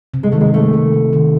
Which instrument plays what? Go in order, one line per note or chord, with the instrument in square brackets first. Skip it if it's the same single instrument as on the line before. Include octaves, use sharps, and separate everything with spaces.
[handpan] C3
[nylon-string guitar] G#3
[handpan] D#3 [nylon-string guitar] A3
[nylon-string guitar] G#3
[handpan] C3 [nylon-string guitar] A3
[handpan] C3
D#3
D#3